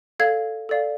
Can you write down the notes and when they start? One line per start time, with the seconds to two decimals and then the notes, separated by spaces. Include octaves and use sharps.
0.20 A4 D5 F5 G#6
0.69 A4 D5 F5